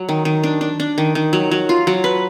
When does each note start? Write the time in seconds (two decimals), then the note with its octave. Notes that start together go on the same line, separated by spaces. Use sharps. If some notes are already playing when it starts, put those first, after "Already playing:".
Already playing: F#3
0.09 D#3
0.25 D#3
0.44 D4
0.61 D4
0.80 D4
0.98 D#3
1.15 D#3
1.33 F#3
1.51 F#3
1.69 F4
1.87 F#3
2.04 B4